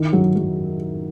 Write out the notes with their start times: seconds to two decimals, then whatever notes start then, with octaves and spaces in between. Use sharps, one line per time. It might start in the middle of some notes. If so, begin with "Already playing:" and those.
Already playing: D#3 E4
0.13 F#3
0.36 F#3